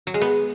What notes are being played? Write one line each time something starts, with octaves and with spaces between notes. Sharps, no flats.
F#3
G#3
B3